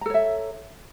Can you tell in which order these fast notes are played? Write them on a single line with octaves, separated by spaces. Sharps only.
A#5 A4 C#5 E5